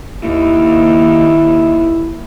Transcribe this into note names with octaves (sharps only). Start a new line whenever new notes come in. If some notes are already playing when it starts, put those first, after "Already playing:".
D#2 E4